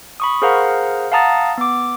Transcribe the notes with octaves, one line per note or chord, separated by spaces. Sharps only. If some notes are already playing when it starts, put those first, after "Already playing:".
B5 C#6 D#6
G#4 A#4 C5 F5 F#5 A#5
F5 F#5 A5 A#5 D#6 A6
B3 D6